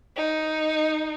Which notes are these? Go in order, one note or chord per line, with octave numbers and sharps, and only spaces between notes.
D#4